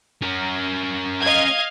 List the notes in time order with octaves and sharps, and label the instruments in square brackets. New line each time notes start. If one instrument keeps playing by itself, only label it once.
[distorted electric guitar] C#4 A#4
[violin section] D#5 F5 G#6